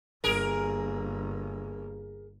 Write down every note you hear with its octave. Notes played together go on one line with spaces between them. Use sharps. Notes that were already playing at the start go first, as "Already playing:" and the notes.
G1 A#3 G#4 A#4